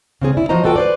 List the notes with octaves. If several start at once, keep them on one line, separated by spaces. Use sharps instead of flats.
C#3 C4 G#4
E4 D5
F3 F#4 C5 D#5 A#5
F4 F#4 A4 B4 G5
B4 C5 D5